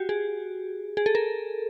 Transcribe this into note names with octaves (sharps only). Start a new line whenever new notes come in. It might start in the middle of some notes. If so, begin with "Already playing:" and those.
Already playing: F#4 G4
G#4
G#4
A4
A#4